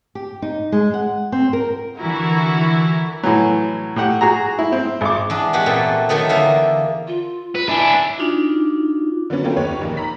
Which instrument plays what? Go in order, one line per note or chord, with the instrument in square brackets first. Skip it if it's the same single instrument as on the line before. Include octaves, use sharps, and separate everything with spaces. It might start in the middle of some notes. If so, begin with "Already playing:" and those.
[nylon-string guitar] G4
D#4
G#3
F#5
C4
A#4
[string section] D3 E3 E4 F#4 A#4
[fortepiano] A2 E3 F#3
A2 G4 F#5
F#4 G#4 A#5
E4
C4
G#1 D6
[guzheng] E2 D4
G#3 B3 F#4 G4
A#2 A3 C4
D#3 F#3 A3 B3
E2 D3 A#3 F4 E5 A#5
[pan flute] F4
[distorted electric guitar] B4
[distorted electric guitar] D4 E4 [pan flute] G#5
[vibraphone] D4 D#4 F4 F#4
[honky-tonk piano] D3 F#3 A#3 B3 C#4
A3 B3 C#4 F4 A#4 G5
D#2 B4 C#5
A#1 D#3 A#3
A#5 B5 B6